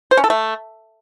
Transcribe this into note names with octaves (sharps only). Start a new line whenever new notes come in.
C5
C#4
A4
A3